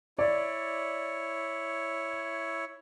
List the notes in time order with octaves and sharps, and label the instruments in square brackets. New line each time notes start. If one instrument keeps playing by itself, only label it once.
[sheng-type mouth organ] E4 C#5 [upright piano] D5